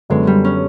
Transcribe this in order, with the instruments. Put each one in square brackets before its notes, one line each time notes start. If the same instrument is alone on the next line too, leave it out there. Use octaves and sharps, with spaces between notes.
[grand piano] F#2 D3 F#3 B3 [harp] G#3
[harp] G3
C#4